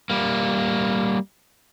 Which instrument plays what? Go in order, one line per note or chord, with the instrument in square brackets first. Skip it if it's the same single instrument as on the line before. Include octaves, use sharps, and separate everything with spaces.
[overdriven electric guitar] G3 A#3